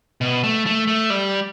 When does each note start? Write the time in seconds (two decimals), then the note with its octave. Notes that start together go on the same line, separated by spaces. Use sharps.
0.21 B2
0.44 A3
0.66 A3
0.87 A3
1.10 G3